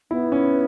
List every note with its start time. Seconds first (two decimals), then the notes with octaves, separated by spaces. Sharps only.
0.11 B3 E4
0.32 C#4